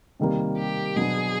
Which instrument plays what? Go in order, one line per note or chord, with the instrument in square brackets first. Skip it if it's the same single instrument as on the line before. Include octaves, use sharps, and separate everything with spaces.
[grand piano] C3 D#3 G3 A#3
[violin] G4
[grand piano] B2 F#3 B3 D4 [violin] G#4